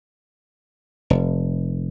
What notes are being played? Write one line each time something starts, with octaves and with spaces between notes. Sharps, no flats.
F1